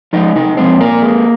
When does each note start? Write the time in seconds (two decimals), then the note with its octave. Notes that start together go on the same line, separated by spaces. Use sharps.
0.13 F3 G#3 D#4 D#5
0.35 C3 D#4 D#5
0.57 F3 G#3 C4 C5
0.80 A#2 A#3 A#4
1.02 G#3